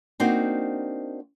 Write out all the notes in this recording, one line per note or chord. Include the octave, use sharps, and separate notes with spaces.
A#3 C4 D4 D#4 F#4